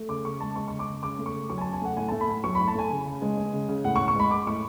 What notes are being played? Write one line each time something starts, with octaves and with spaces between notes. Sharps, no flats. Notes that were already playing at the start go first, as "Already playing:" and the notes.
Already playing: A3
C#3 D6
C#3 C#6
G#3 A5
G#3 C#6
C#3 C#6
D6
C#3
C#3 D6
A3
C#6
C#3
F#3 C#6
G#5
C#3 A5
G#5
A3 F#5
A2 G#5
A3 A5
B5
A2
F#3 C#6
A2 B5
A5
A3 G#5
C#3
C#3
G#3
G#3
C#3
C#3
A2 F#5
C#6
A2
C#6
G#3 B5
G#3 D6
A2 C#6